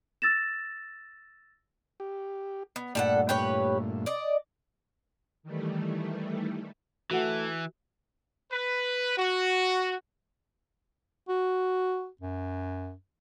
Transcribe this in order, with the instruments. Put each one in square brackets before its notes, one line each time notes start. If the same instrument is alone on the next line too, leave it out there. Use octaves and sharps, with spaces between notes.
[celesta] E6 A6 A#6 E7
[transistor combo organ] G4
[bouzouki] B3
[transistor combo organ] G2 A#2 A3 [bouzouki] G3 A4 F#5
[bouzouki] G4 B4 C#5
D5 D#5
[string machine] D#3 E3 G3 A3
[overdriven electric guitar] E3 [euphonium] A3 [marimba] F#4 F#5
[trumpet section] B4
F#4
[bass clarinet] F#4
F#2